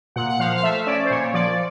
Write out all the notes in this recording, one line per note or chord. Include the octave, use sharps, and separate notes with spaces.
A#2 F#5
F#5
F3 F5
F5
A3 E5
C#4 D5
C5
A#2 C#5
F3 D5